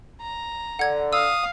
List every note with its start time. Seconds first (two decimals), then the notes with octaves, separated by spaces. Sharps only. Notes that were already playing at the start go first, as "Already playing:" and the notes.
0.21 A#5
0.79 D3 F#5 G#6
1.13 F5 D#6 E6